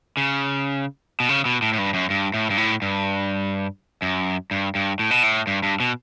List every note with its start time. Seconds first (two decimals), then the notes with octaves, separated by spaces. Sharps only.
0.17 C#3
1.20 B2
1.29 C#3
1.45 B2
1.62 A2
1.73 A2
1.78 G2
1.94 F#2
2.10 G2
2.34 A2
2.50 G2
2.57 A2
2.82 G2
4.02 F#2
4.51 G2
4.75 G2
4.99 A2
5.11 B2
5.23 A2
5.47 G2
5.63 G2
5.80 B2